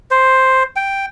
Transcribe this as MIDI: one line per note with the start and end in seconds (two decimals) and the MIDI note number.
0.11 0.63 72
0.76 1.06 79